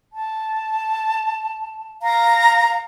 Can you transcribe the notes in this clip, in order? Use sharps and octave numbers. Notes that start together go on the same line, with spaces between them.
A5
F5 A#5